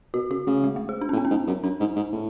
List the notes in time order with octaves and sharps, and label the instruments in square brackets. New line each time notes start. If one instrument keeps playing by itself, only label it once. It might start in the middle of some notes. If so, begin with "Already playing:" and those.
[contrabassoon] B2 [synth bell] F#4
[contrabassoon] C#3 [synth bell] F#4
[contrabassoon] C#3 [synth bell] A3
[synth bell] G#3
A3
G#4
D4
C#4
[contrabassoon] A2
[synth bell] B3
C#4
[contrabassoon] G#2
F#2
[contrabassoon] F#2 [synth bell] D4
[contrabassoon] G#2
G#2
A2